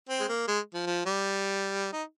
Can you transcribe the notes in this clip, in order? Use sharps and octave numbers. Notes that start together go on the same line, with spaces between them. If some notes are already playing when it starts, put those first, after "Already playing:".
C4
G#3
A#3
G#3
F3
F3
G3
D#4